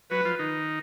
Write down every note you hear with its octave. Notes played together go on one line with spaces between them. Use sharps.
F#3 F#4 B4
F3 F4
D#3 D#4